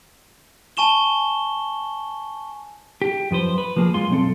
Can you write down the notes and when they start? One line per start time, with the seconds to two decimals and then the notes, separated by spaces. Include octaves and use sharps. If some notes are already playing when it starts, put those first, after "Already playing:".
0.77 G#5 A5 C#6 E7 G7
3.02 G4
3.31 F#2 F3 B4 C5
3.58 B4
3.76 F3 A#3 G#4
3.94 F#2 G#3 F4 C6
4.10 B1 F#2 C4 A4